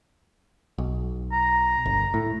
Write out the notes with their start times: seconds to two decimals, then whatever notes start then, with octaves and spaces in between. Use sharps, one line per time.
0.78 B1
1.32 A#5
1.86 G1
2.14 A2